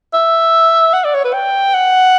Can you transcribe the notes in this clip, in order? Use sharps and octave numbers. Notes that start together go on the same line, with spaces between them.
E5
F#5
D5
C#5
B4
G5
F#5